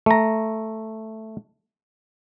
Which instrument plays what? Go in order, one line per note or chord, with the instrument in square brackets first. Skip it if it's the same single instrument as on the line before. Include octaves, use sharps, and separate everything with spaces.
[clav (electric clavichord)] A3 A#5